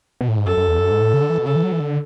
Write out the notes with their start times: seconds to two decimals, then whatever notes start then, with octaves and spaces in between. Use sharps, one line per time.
0.21 B2
0.28 A2
0.37 G#2
0.46 F#2 A4
0.57 F#2
0.68 E2
0.79 F#2
0.91 G#2
1.01 A2
1.13 C#3
1.22 D3
1.30 E3
1.38 B2
1.46 C#3 A4
1.56 E3
1.63 F#3
1.72 E3
1.80 D3